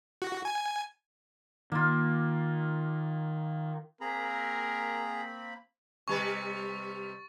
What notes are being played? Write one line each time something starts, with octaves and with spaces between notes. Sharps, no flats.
F#4
G#5
D#3 A#3 F4
A#3 C4 G#4 A#4 A#5 B5
C3 G3 B4 C#6 A6